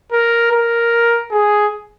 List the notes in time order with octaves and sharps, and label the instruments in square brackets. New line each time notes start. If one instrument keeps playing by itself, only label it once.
[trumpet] A#4
A#4
G#4